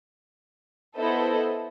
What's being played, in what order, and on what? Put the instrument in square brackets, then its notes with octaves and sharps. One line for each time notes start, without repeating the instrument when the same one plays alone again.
[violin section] B3 E4 A4 C5 D#5